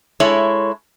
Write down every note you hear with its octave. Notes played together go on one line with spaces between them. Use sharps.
G#3 E4 A4 C#5